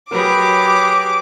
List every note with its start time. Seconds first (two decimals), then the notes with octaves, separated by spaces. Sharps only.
0.11 F#3 G4 G#4 A#4 B4 D6